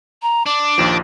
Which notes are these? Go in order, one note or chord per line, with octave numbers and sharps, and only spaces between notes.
A#5
D4 D6
A#1 D#2 F3